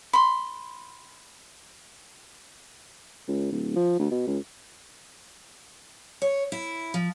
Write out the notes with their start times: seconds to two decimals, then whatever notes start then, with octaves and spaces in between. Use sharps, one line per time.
0.13 B5 C6
3.28 C#2
3.52 D1
3.76 F3
3.99 D2
4.11 B2
4.27 C#2
6.22 C#5
6.52 E4
6.94 F3